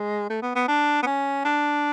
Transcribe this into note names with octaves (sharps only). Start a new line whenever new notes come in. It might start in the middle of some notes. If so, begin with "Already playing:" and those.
Already playing: G#3
A3
B3
B3
D4
B3
C#4
D4